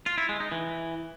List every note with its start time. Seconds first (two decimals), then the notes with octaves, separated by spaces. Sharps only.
0.06 F4
0.18 E4
0.29 G#3
0.40 D#4
0.52 E3